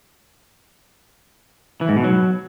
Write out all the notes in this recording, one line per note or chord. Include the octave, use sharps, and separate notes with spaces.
E3
G#2
B2
F#3